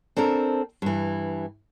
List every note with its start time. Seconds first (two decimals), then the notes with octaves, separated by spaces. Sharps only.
0.17 C4 D4 A4 A#4
0.82 G2 E3